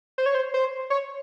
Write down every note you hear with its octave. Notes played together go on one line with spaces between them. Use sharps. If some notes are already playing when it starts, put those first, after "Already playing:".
C5
C#5
C5
C5
C#5